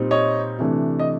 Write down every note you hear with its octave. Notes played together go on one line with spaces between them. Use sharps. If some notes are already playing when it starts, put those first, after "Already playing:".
Already playing: A#2 G3 C4 D#4
C#5 D#5
C3 E3 A3 D4
D#5